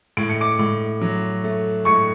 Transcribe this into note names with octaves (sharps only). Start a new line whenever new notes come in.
A2 D7
C#7
D6 D7
A2
F#3
A3
A2 C#6 C#7